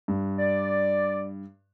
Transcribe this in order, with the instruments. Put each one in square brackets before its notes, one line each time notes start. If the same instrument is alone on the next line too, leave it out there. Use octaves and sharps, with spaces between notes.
[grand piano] G2
[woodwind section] D5